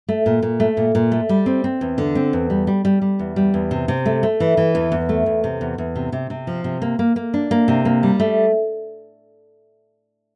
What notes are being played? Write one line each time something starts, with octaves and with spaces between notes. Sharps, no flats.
A3
A#2
A#2
A3
A#2
A#2
A3
G3
C4
C4
E2
D3
C4
E2
G3
G3
G3
G3
E2
G3
E2
C3
C3
A3
A3
E3
E3
E2
E2
A3
E2
C3
E2
E2
C3
C3
C3
F3
C3
A#3
A#3
A#3
D4
A#3
C3
A#3
G3
A3